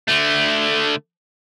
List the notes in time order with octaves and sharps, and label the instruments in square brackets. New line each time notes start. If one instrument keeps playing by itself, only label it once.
[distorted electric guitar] D3 A3